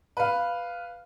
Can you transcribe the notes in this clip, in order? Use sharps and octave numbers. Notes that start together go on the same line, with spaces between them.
B4 F5